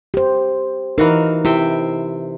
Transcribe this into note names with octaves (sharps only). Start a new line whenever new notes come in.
G4 C5
E3 D#4 F#4 A#4 F5
C3 E4 E5 G5